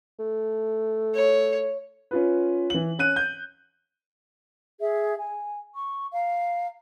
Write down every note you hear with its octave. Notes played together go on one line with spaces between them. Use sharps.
A3
C#5
C#4 F4 B4
E3 F#7
C#4 F#6 D#7
G6
G#4 E5
G#5
C#6
F5 A#5